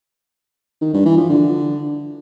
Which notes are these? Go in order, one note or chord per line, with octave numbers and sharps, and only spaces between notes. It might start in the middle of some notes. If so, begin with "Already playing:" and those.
D#3
G2
E3
F3
D3